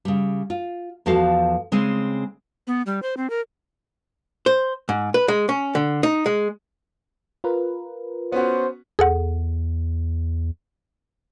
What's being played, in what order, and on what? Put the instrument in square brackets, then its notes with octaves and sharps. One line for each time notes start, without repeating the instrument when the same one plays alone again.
[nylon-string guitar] C#3 G3
F4
E2 F3 F#4 A4 F5
C#3 G#3 C4 G#5
[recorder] B3
G3
C5
C4
A#4
[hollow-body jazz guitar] C5
G#2
B4
G#3
C#4
D3
D#4
G#3
[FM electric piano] F4 A#4 B4
[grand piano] B3 C#4 F#4 [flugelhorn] C5
[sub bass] E2 [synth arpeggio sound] G#4 A4 F#5